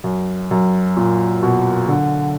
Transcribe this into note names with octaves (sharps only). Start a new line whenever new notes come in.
F#2
F#2
A#2
B2
D3